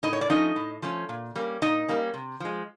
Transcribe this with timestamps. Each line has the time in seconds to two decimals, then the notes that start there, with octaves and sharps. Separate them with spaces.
0.03 A2 D#4 D#5
0.13 C#5
0.21 D5
0.30 F3 A3 C#4 D#4 D#5
0.56 A2
0.82 F3 A3 C#4
1.09 A#2
1.35 G3 A#3 C#4
1.62 A#2 D#4 D#5
1.88 G3 A#3 C#4
2.14 C3
2.40 F3 G#3